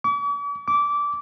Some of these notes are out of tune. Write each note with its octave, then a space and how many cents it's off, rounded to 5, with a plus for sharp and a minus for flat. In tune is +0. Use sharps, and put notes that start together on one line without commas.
D6 -45
D6 -15